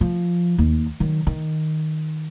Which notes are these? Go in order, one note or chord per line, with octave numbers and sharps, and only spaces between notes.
F3
D#2
D#3 F#3
D#3